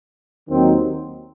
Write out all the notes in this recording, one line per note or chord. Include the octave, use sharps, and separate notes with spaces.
D#2 D#3 F#3 C4 D#4